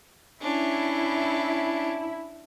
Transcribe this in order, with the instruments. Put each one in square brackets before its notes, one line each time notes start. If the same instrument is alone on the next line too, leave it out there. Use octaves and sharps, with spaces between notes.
[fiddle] C#4 D4 [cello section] E4